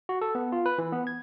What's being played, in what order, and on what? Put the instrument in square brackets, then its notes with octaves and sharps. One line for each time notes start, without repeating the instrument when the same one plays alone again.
[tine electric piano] F#4
A4
B3
F4
B4
E3
B3
G#6